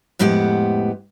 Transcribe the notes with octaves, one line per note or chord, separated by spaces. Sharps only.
F2 A2 G#3 B3 G4 F#5